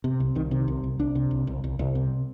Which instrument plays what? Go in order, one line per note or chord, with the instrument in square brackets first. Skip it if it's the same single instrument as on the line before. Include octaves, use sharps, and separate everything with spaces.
[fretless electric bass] C3
C2
C2 D#3
C3 D#3
C2
C2
C2 D4
C3
C2
C2
C2
C2
C3